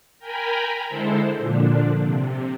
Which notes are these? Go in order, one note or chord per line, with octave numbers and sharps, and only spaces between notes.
A#4 G5 G#5 A#5 B5
D3 G#3 E4 A4 C5
A#2 D3 F3 D4
C3